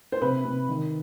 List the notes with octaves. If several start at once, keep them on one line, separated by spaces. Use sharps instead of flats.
C5
C3 B4
C3
D#3